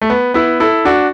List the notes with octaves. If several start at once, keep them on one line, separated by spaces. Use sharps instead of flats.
A3
B3
B3 E4
E4 A4
D4 F#4